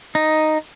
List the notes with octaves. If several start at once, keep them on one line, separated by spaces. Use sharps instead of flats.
D#4